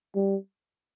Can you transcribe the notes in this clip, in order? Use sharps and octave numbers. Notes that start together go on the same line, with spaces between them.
G3